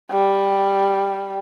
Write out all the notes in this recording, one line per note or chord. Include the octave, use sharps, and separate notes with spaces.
G3